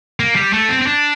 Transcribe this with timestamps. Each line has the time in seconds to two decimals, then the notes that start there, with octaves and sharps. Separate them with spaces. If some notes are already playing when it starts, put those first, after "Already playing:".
0.20 A#3
0.36 G3
0.53 A3
0.69 C4
0.82 C4
0.87 D4